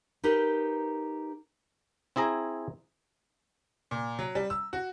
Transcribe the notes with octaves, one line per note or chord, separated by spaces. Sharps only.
D#4 G4 A#4 B4
C4 E4 G#4 A#5
A#2
F#3
G3
E6
F#4